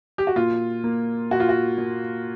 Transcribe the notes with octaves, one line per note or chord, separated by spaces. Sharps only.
G4
F#4
A#2 F4
A#3
A#2 F#4
F4
F#4
A#2